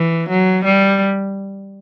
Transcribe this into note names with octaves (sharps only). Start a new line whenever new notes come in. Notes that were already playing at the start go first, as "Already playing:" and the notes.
Already playing: E3
F#3
G3